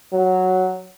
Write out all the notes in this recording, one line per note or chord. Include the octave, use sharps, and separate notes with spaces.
F#3